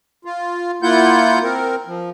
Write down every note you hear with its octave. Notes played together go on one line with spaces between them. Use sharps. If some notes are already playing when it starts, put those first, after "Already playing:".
F4
A#3 E4 F4 F#5 G6
C4 A#4
F3